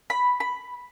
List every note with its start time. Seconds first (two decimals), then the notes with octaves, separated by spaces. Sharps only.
0.10 B5
0.40 B5